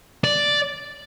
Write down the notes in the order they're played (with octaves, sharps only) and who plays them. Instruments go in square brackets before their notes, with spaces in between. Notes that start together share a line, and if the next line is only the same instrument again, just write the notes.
[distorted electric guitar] D5